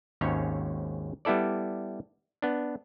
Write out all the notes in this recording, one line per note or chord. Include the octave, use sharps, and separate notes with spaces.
G#1 D#2 G#2 C#4 C#5
G3 B3 E4 A4 D5
B3 D4